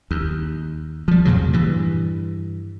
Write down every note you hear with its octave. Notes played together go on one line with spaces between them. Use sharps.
D#2
F3 G3
F2 A#2 C#3 F#3
G2 E3